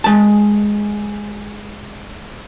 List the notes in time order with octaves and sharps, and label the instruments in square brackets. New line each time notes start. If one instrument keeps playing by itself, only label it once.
[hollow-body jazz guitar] G#3 A5